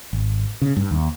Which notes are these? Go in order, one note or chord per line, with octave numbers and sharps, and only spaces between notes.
G#1
C#3
G2
D#2